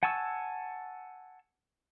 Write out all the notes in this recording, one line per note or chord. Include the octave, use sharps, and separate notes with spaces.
F#5 G#5 A5 C#6 E6